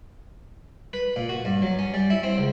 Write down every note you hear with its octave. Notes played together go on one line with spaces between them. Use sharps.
B4
A#2
F#4
G2
F#3
C#4
G3
E4
C4
C#2